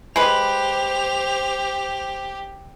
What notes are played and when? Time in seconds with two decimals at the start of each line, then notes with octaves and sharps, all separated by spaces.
0.16 G#3 G4 B4 C5 F7